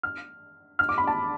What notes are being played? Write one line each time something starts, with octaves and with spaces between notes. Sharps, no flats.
F6
F6
D6
B5
A5